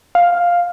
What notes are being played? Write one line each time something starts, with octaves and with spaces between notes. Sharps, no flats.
F5